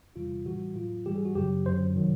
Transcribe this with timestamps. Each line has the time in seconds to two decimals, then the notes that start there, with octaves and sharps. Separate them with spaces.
0.16 E2 C3 E3 G3 F4
0.45 A2 E3 G3 F#4
0.75 A2 F#3 F4
1.06 G#2 E3 G3 G4
1.16 G#4
1.25 F#4
1.35 F#2 C#3 F#3 G4
1.66 F#2 D3 F#3 C5
1.96 C3 D#3 F#3